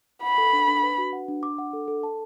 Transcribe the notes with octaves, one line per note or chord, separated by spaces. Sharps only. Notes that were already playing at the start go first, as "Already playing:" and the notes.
F#5 B5
A4
D4
D4
B4
F#4
F#5
D4
D6
F#5
A4
A4
A5